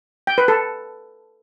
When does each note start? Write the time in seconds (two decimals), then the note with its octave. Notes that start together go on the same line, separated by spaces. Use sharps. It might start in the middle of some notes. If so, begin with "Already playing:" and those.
0.27 G5
0.38 B4
0.48 A4